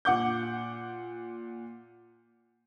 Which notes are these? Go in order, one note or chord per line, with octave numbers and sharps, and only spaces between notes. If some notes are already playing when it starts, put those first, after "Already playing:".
A#2 F#5 D6 G6